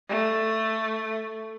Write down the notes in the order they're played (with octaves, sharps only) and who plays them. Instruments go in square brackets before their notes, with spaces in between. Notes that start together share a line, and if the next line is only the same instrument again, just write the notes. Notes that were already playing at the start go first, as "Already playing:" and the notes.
[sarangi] A3